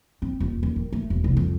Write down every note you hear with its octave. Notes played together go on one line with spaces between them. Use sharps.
C4
D#1
D#1
D#3
A3
E1
C2
F2